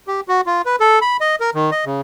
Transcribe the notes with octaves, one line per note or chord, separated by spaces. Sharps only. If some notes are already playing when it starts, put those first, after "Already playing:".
G4
F#4
F4
B4
A4
B5
D#5
A#4
D#3
D#5
C#3